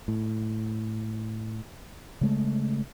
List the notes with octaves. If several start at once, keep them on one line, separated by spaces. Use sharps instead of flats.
A2
C#3 G#3 A3